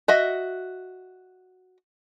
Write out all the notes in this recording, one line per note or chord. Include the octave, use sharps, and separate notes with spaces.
F#4 D#5 E5